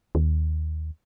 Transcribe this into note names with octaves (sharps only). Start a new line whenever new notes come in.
D#2